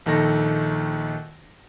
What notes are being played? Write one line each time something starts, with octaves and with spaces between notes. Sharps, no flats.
A#1 D#3 A4 A#6